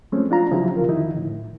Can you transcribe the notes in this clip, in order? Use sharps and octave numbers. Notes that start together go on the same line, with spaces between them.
F3 G#3 A3 C4 C#4
D4 F4 A#5
C#3 F3 F#3 E4 G4
C2 C#3 F4 A#4
F2 D3 D#3 F3 D#4 E4
A2